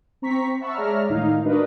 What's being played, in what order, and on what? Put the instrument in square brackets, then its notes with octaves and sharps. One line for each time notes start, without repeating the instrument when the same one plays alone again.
[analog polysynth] C4 A#5 C#6 B6
E5 F#5 A5 B5 C#6 E6
G#3 C#5 D5 E5 A#5 F6
A2 D#3 D#4 F5
D4 F#4 A#4 B4 D#5